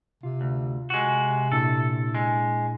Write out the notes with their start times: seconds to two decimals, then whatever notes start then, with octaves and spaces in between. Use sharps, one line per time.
0.23 C3 F4
0.41 D2
0.90 C3 G#3 F#4
1.52 A#2 D4 E4 A4
2.15 G#3